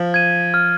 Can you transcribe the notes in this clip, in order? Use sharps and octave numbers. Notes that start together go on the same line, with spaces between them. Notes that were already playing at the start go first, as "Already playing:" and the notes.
Already playing: F3
G#6 D#7
F6